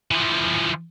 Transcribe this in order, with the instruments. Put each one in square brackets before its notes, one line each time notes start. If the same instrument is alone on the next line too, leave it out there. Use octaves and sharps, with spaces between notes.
[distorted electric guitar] E3 F3